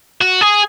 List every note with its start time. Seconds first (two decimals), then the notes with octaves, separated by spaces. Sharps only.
0.21 F#4
0.41 G#4